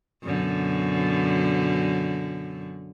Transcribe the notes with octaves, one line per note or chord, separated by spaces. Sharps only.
F#2 B2 D3